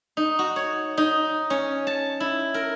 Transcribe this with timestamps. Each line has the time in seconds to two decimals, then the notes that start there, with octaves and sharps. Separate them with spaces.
0.17 D#4
0.39 F#4
0.56 C#5
0.97 D#4
1.50 C#4
1.87 A5
2.20 E4
2.54 A#4